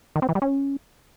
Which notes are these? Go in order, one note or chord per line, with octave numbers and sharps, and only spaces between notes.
D#3
C4
E3
G3
C#4